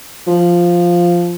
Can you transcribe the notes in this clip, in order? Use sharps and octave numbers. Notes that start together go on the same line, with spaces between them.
F3